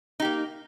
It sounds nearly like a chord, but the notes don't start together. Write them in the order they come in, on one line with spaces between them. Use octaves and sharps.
D#4 G4 A#3